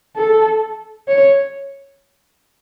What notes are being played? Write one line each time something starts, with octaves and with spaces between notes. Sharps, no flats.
A4
C#5